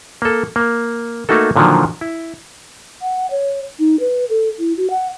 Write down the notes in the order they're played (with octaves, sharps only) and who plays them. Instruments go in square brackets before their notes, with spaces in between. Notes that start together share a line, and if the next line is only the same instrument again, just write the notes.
[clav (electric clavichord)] A#3 A4
A#3
A3 A#3 D#4 F#4 A4
A#2 D3 D#3 F3 F#3
E4
[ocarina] F#5
C#5
D#4
B4
A4
E4
F#4
F#5